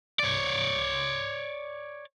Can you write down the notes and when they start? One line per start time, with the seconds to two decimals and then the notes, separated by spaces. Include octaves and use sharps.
0.19 C#5 D5